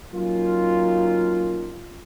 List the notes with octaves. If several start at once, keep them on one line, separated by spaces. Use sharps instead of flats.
F#3 A#3 C#4 D#4 F4